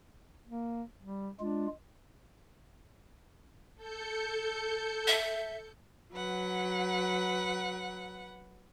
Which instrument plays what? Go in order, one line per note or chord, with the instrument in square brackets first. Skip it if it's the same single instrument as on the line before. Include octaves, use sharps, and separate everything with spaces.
[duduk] A#3
G3
[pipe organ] G#3 F4 [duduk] D4
[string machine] A4 G6 C#7
[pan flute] E5
[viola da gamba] F#3 [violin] B4 F#5